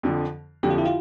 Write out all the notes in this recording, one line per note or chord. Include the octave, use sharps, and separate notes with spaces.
F2 D3 F3
F2 D3 F3 G4
F4
E4
F4